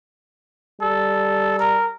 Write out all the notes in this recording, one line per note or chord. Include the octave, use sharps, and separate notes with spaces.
G3 A4
A#4